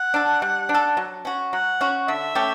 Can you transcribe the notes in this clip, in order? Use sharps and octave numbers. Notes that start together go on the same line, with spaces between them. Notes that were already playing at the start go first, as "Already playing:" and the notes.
Already playing: F#5
D4 A4
G3
D4
A4
F#3
C#4 F#4
F#3 F#5
C#4 F#4
D3 E5
A3 C#4 G4